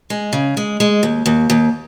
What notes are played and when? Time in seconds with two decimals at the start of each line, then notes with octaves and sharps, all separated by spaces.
0.10 G#3
0.33 C#3
0.57 G#3
0.80 G#3
1.03 D#2
1.26 D#2
1.50 D#2